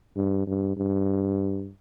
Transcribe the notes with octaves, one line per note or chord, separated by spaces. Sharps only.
G2
G2
G2